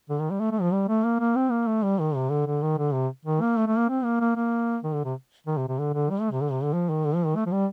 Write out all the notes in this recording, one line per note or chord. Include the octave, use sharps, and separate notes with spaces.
D3
D#3
G3
A3
A3
F3
G3
A3
A#3
A#3
C4
A#3
A3
G3
D#3
C3
D3
D3
D#3
D3
C3
D#3
A#3
A3
A3
A#3
C4
A#3
A#3
A#3
D#3
D3
C3
D#3
C3
C3
D3
D3
G3
A3
C3
D3
C3
D3
F3
D#3
D3
F3
D#3
A3
F3
G3